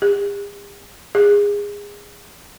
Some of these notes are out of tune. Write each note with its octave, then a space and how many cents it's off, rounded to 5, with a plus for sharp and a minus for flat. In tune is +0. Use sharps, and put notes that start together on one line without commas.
G#4 -45
G#4 -20